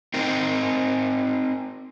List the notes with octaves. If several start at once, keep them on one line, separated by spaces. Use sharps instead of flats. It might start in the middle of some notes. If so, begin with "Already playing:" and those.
C4 D#4 A#4